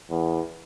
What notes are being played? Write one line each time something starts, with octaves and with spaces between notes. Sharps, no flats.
E2